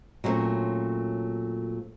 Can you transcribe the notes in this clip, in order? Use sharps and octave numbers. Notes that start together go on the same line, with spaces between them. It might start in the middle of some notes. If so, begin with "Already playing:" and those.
A#2 F#3 G3 A3 C4 C#4